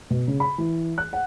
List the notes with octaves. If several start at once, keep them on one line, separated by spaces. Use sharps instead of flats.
B2
C#3
B5
E3
F#6
F#5